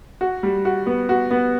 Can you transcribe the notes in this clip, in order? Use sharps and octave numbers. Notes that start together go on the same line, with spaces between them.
F#4
G3
F#4
B3
F#4
B3